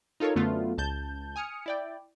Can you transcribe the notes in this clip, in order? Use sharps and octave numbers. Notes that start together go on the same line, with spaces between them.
D#4 F4 A4 A#4 C#5
F#2 D3 A3 B3 F4
C#2 A5 G6
G#5 D#6 F6 C#7
E4 D5 G5